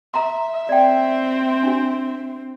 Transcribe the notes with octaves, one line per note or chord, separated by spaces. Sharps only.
E5 A#5 C6
C4 D5 G5
D4 F#4